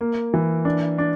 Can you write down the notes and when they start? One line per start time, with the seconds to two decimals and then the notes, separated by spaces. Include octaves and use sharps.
0.01 A#3
0.34 E3
0.65 D4
0.98 D4